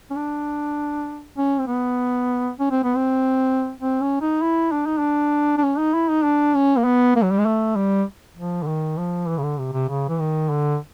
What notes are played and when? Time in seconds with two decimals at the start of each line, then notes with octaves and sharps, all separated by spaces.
0.10 C#4
0.16 D4
1.37 C#4
1.60 C4
1.68 B3
2.59 C#4
2.71 C4
2.84 B3
2.96 C4
3.81 C4
4.01 C#4
4.21 D#4
4.42 E4
4.72 D4
4.86 D#4
4.99 D4
5.57 D4
5.63 C#4
5.78 D#4
5.94 E4
6.09 D#4
6.24 D4
6.55 C#4
6.77 A#3
6.85 B3
7.15 A#3
7.23 F#3
7.31 G3
7.38 G#3
7.45 A3
7.76 G3
8.37 F3
8.63 D3
8.67 D#3
8.98 F3
9.28 E3
9.38 C#3
9.43 D3
9.59 C3
9.73 C3
9.89 C#3
10.08 E3
10.20 D#3
10.49 D3